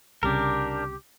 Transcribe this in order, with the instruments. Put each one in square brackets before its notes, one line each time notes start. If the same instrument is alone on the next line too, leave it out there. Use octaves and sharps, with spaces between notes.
[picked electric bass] C2 C#3 [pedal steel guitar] D4 A#4 [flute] G4